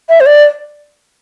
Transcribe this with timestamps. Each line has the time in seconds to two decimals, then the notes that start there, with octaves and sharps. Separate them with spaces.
0.09 E5
0.20 C5
0.26 D5